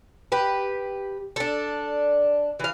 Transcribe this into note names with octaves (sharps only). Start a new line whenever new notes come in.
G4 B4
D4 A4
E3 F5